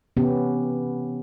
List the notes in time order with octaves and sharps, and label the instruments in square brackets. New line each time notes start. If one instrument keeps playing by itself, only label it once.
[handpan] C3 E3 B3 C#4 G4